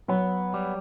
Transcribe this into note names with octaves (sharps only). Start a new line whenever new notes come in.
F#3 B3
G3